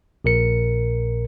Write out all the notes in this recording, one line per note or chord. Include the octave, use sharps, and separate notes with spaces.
A#1 A#2 A#4 C#7